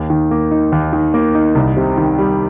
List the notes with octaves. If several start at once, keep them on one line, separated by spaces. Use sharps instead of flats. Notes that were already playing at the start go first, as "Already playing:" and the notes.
Already playing: D#2
D#3
A#3
D#4
D#2
D#3
A#3
D#4
C2
C3
D#3
G3